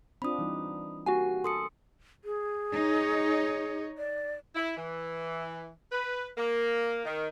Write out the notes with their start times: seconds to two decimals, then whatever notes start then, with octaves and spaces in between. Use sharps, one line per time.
0.22 C4 D4 F4 B5 D#6
0.39 E3 G3 D#4
1.06 A#3 F#4 G4 F#5 G#5
1.44 A4 C6 D#6 C#7
2.25 G#4
2.72 D#4 C#5
3.98 D5
4.55 E4
4.76 E3
5.92 B4
6.38 A#3
7.05 D#3